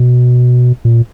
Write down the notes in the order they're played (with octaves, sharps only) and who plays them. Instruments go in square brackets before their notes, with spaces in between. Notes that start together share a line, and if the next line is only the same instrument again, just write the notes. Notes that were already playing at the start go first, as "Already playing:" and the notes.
Already playing: [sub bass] B2
A#2